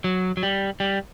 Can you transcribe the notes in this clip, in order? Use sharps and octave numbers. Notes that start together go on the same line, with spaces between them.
F#3
F#3
G3
G3